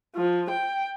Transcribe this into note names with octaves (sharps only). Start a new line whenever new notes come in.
F3
G5